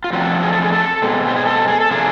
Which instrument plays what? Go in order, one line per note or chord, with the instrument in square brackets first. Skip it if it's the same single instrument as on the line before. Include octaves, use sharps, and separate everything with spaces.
[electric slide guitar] F4
D3 F3 A3 C4 F#4
G#4
A4
G#4
A4
B2 G#3 C4
G4
G#4
A4
G#4
A4
C3 F3 A#3 D4 G#4